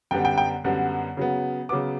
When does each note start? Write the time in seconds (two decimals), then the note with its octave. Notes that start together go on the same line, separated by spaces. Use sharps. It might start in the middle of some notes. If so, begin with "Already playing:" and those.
0.11 F#2 D3 G3 B3 G5
0.25 G5
0.38 G5
0.64 F#2 D3 G3 B3
1.17 C#3 F#3 B3
1.69 C#3 F#3 B3 D6